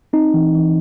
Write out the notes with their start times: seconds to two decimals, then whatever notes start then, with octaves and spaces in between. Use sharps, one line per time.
0.13 C4 D#4
0.34 E3
0.54 E3